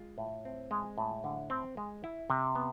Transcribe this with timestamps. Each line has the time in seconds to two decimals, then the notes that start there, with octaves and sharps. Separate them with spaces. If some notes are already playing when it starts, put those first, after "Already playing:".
Already playing: G#3 F4
0.18 A2
0.45 C4
0.71 G#3
0.98 A2
1.24 D3
1.50 C4
1.77 G#3
2.04 E4
2.30 C3
2.55 B3